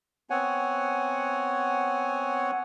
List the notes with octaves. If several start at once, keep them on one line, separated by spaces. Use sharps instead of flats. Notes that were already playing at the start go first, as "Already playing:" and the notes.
B3 C4 C#5 F#5 G#5